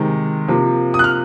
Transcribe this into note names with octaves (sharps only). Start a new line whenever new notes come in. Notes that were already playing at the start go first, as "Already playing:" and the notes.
Already playing: C3 D#3 G#3
C3 F3 A#3
D#6
F#6
F6